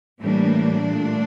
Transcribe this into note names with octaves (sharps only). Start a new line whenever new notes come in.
A2 E3 G3 A#3 D4
A#2 A3